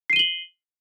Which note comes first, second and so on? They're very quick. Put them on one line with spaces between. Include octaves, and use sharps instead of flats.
C7 D#7 G7 F#7